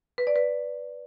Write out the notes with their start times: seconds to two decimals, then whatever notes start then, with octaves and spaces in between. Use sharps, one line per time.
0.18 B4
0.27 D5
0.36 B4